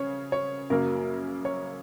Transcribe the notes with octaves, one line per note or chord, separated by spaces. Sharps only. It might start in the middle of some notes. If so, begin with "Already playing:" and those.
Already playing: C#3 C#5
C#5
F#2 C#3 F#3 A#3 A#4
C#5